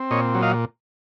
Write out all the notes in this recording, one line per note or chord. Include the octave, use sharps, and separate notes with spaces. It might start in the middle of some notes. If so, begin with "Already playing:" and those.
Already playing: C4
A#2 C#5 D#5
F#3
D#5 F5